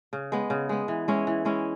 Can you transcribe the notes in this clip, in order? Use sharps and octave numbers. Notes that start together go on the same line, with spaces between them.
C#3
G#3 B3
C#3
G#3 B3
E3
G#3 C#4 E4
E3
G#3 C#4 E4